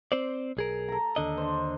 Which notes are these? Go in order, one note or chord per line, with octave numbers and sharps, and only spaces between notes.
C4 C5 D5
B1 G#4 A#4
A4 A#5
D#2 D3 D#5
D4 C5